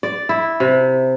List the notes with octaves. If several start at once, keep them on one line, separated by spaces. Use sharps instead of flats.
D5
E4
C3